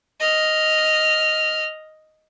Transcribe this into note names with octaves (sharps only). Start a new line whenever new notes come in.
D#5 F6